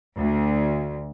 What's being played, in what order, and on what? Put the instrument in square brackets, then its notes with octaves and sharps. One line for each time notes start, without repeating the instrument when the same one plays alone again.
[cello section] D2